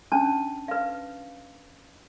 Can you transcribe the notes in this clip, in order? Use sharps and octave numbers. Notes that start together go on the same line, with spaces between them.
C#4 D4 A5
B4 F5